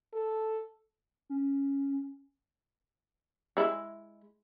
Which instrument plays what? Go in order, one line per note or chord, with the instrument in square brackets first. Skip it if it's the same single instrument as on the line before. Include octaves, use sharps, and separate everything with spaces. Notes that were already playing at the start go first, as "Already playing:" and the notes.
[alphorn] A4
[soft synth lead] C#4
[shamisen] G#3 E4